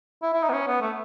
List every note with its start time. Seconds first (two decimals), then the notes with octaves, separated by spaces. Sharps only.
0.23 E4
0.33 E4
0.43 D#4
0.49 B3
0.53 C#4
0.68 B3
0.81 A3